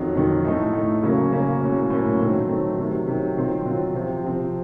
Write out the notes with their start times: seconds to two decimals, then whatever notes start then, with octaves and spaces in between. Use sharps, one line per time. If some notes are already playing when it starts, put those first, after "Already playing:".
Already playing: F2 D#3 F#3
0.15 F2 D#3 F#3
0.45 A2 A3 D#4
0.73 A2 A3 D#4
1.03 C#3 F#3 A#3 C#4
1.32 C#3 F#3 A#3 C#4
1.61 A2 F#3 A#3 C#4
1.90 A2 F#3 A#3 C#4
2.19 D#3 F#3 A3 C4
2.49 D#3 F#3 A3 C4
2.78 C3 D#3 F#3
3.08 C3 D#3 F#3
3.37 D#3 F#3 C4 F4
3.65 D#3 F#3 C4 F4
3.94 C3 F3 C4
4.24 C3 F3 C4